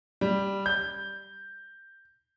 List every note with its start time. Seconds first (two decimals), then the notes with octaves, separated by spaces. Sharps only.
0.21 G3
0.66 G6